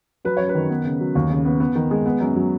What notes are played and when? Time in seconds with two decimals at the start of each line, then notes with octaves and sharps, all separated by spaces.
0.25 F#3 B4
0.37 F#2 C#5
0.49 B4
0.54 D#3
0.70 B3
0.84 C#3
1.00 F#3
1.15 D#2
1.30 C#3
1.45 B3
1.60 B3
1.75 D#3
1.91 G#3
2.06 B3
2.21 F#2
2.36 F#3